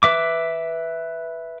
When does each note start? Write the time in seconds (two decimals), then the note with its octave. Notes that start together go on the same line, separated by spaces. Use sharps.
0.03 B4 E5 D6